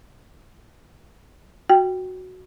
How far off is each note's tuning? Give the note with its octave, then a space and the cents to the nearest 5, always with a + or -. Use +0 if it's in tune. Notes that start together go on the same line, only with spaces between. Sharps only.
F#4 +0 G5 +0